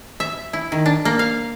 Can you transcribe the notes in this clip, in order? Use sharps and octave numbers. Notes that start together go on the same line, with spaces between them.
E5
E4
D#3
D4
A#3
F5